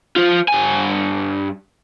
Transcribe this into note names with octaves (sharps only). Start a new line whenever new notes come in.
F4 C5
G2 G#5